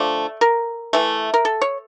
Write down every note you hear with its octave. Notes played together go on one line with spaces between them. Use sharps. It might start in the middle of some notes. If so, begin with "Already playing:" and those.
Already playing: D3 F3 A3 D5
A#4
E3 A3
A#4
A4
C#5